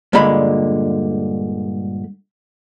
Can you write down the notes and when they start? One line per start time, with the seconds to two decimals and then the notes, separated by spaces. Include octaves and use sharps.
0.13 G2 A#2 D3 G#3 B5